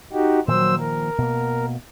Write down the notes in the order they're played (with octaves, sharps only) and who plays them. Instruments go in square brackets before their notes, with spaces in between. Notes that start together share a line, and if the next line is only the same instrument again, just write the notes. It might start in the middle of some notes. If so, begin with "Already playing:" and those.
[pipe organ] D#4 F#4 G4
[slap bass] A#2 D#3 F3 [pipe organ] F#3 C5 E6
[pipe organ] A#4
[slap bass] B2 A#3